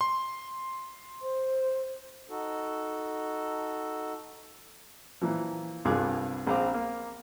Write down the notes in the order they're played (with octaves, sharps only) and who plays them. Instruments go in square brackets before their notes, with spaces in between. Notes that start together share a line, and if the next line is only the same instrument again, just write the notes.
[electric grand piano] C6
[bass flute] C5
[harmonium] D#4 F#4 A4
[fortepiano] A#2 E3 F3
C2 G2 F4 G#4 D6 F#6
A#1 C4 G#4 F5 A#5 D6
A#3